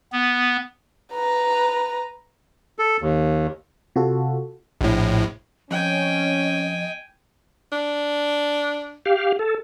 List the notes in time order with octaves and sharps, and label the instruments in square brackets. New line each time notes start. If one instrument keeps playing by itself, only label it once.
[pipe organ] B3
[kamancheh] B4 A#5
[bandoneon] A4
D#2
[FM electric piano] C3 F4 F#4 A4
[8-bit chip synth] A#1 A2
[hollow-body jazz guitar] F2 [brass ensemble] C#4 [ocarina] D#5 [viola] G5 G#5
[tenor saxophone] D4
[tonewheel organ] G4 F5
A4